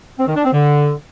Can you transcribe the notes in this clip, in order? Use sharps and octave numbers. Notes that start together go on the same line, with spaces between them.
C4
D#3
D4
C4
D3